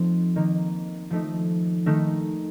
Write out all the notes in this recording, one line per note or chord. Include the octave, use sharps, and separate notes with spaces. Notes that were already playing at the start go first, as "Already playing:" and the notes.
Already playing: F3 A3 C4 D#4
D#3 A#3 D#4
F3 A3 D#4
D#3 A3 D#4